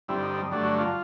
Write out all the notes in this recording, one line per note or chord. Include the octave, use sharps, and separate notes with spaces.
G2 D3 G3 C4 E4
D#4
D#4
G2 D3 F#3 A3 D4
F#4
F4